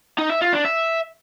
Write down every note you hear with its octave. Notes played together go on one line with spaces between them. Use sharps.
D#4
E5
F4
D4
E5